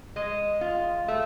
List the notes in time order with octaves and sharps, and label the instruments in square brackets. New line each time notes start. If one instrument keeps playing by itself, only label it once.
[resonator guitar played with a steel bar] G#3 [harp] D#5
[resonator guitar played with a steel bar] F4
[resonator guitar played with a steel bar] A3 [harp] E5